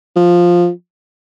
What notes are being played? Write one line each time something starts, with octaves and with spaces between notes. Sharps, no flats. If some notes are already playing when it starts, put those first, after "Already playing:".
F3